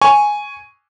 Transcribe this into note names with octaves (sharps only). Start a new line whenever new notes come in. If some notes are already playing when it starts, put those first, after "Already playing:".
G#5 C#6